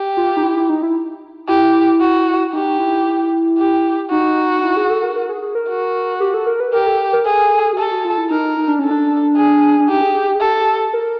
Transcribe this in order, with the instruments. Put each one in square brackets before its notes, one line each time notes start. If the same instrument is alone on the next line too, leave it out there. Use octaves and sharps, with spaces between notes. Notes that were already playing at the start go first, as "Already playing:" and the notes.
Already playing: [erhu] G4
[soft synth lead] F4
D#4
E4
E4
D#4
E4
[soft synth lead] E4 [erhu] G4
[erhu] F#4
[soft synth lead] D#4 [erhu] G4
[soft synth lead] E4
[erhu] G4
[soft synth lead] D#4 [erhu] F#4
[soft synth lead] E4
G#4
A4
A#4
A#4
G#4
G#4
A#4
[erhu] F#4
[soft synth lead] G4
A4
A#4
B4
[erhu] G4 [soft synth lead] A#4
[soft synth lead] A4
A#4
[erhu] G#4 [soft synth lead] A4
[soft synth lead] F#4
[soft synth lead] G4 [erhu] A4
[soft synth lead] F#4
F4
E4
[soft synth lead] D#4 [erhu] A#4
[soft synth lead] D#4
D4
[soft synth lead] C#4 [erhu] A4
[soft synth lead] D4
[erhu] G#4
[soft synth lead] D4
[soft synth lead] D#4 [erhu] G4
[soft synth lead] G#4
G#4
G4
G#4
[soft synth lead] G4 [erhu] A4
[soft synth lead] A#4